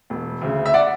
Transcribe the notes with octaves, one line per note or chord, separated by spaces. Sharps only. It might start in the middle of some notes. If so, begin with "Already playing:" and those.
E1
D2 C#3
E5
D5 F#5